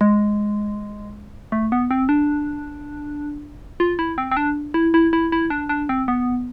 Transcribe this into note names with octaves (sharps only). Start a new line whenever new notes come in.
G#3
A3
B3
C4
D4
F4
E4
C4
C4
D4
E4
E4
E4
E4
D4
D4
C4
B3